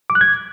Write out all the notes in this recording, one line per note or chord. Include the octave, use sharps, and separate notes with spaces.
D6
F#6
G#6